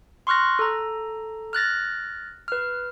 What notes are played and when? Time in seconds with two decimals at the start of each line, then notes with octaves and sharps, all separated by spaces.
0.27 C6 C#6 F6 F#6 A#6
0.59 A4 A#5
1.53 F6 F#6 A6 A#6
2.48 B4 F6